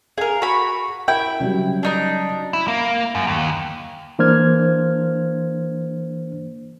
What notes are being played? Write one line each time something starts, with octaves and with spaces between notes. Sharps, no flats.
G#4 A#4 F5
F#4 B5
E4 A#4 G5
C#3 F#3 G3
D4 D#4 A#5
E4
A#3
F#2
D#2
E3 A#3 D4 C5 F6 G#6